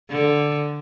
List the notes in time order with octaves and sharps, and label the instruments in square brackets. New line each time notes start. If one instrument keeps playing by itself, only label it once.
[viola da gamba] D3